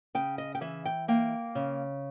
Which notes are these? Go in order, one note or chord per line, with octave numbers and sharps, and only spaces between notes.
C#3 G5
D#5
G5
E3 E5
G5
A#3 G5
C#3